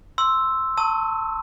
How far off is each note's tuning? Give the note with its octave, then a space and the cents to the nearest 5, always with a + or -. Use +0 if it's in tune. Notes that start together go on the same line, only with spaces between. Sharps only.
C6 +5 E6 +0
A5 +25 C#6 +0 E6 -40